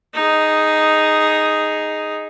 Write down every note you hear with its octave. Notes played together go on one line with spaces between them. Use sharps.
D#4 G#4